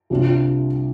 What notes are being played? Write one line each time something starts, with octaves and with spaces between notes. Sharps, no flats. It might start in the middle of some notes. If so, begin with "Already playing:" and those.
C2 C3 G3 D4 F4